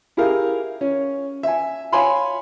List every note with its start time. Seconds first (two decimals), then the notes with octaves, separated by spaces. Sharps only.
0.17 E4 G4 G#4 A#4 F5
0.81 C#4
1.43 E5 G#5
1.92 C#5 F5 G#5 B5 C6